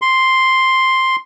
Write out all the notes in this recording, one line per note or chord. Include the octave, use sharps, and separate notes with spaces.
C6